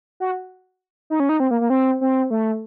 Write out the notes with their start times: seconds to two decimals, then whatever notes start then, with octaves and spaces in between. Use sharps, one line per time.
0.20 F#4
1.10 D#4
1.20 C#4
1.29 D#4
1.40 C4
1.51 A#3
1.61 A#3
1.70 C4
2.01 C4
2.30 A3